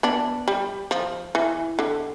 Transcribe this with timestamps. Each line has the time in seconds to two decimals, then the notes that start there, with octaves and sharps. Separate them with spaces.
0.03 B3 D4
0.48 G3
0.91 F3
1.35 E3
1.79 D3